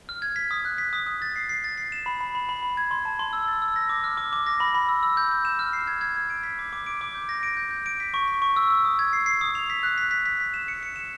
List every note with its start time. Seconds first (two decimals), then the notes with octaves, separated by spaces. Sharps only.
0.09 F6
0.22 G#6
0.36 B6
0.51 D#6
0.65 F#6
0.78 B6
0.93 D#6
1.07 D#6
1.22 A6
1.36 C7
1.49 C7
1.64 A6
1.78 C7
1.92 E7
2.06 B5
2.21 B5
2.35 B5
2.49 B5
2.63 B5
2.77 G#6
2.91 C6
3.05 A5
3.19 C6
3.33 E6
3.48 A6
3.62 E6
3.76 A#6
3.89 D6
4.04 F6
4.17 D6
4.33 D6
4.46 A#6
4.60 B5
4.75 B5
4.89 E6
5.03 E6
5.17 G6
5.31 G6
5.45 E7
5.59 F6
5.73 C7
5.87 G#6
6.01 G#6
6.16 G#6
6.30 D7
6.44 B6
6.59 D6
6.73 D6
6.86 D7
7.01 D6
7.15 G6
7.29 A#6
7.43 D7
7.57 G6
7.71 G6
7.86 D7
8.00 B6
8.14 C#6
8.28 B6
8.42 C#6
8.56 E6
8.70 E6
8.85 D#6
8.99 G#6
9.13 C7
9.26 C7
9.41 D#6
9.55 F7
9.70 B6
9.83 F#6
9.98 B6
10.11 B6
10.26 B6
10.40 B6
10.54 E7
10.68 C#7
10.83 C#7
10.96 E7